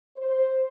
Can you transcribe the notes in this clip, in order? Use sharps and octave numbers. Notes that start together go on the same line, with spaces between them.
C5